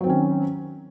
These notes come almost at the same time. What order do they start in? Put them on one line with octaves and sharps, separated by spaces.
F#3 C4 D#3 C#4